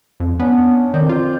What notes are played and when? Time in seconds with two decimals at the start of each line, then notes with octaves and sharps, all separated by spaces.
0.20 F2
0.40 B3 C#4 D4
0.94 F2 D#3 D5 G6
1.09 F4